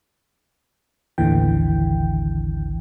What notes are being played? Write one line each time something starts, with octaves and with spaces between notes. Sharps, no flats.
A1 D#2 D3 E3 G5